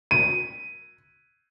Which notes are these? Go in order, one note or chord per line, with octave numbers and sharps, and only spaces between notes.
D#7